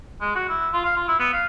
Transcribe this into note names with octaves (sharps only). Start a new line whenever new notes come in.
G#3
F#4
E4
F4
F5
F4
E4
B3
F5